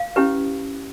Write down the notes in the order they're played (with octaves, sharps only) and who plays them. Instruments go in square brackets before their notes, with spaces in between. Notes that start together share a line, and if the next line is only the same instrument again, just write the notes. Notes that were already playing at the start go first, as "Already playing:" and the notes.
Already playing: [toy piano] F5
C#4 E4 G4 B4